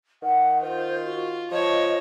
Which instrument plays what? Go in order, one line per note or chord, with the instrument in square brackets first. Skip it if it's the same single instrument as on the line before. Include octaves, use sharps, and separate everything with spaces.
[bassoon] D#3 [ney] F#5
[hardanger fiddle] F4 [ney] C5
[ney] F#4
[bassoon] F3 [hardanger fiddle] C#5 A5 [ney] D#5